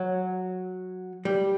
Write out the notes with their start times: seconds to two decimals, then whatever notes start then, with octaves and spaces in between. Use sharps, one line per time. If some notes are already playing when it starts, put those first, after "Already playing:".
Already playing: F#3
1.25 G3